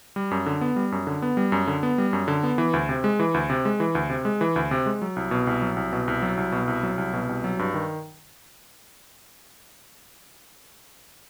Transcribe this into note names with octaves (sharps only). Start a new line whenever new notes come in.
G3
F#2
D3
B3
G3
F#2
D3
B3
G3
F#2
D3
B3
G3
F#2
D3
B3
E3
D2
C3
G#3
E3
D2
C3
G#3
E3
D2
C3
G#3
E3
D2
C3
G#3
F#3
C2
B2
C2
F#3
C2
B2
C2
F#3
C2
B2
C2
F#3
C2
B2
C2
F#3
G2
D#3